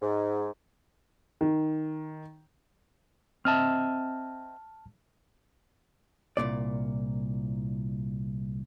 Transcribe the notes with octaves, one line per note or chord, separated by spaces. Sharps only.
G#2
D#3
C4 D#5 E5 A5 F6
C2 F#2 A#2 D5